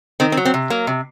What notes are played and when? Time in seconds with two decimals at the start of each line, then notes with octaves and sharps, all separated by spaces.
0.20 D#3 C4
0.32 C4
0.37 F#3
0.45 C4
0.54 C3
0.70 F#3 A#3
0.87 C3